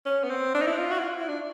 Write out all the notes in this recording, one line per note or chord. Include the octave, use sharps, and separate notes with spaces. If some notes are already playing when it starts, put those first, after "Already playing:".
C#4
B3
C4
D4
D#4
E4
F4
F#4
E4
F4
E4
D4